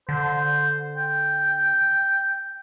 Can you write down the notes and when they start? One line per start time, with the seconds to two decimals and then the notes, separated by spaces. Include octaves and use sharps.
0.09 D3 C5
0.97 G5